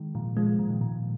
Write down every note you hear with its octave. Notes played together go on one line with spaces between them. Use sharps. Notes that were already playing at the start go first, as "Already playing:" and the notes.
Already playing: D#3 G#3
A#2 F3
F3 G#3
A#2
D#3
A#2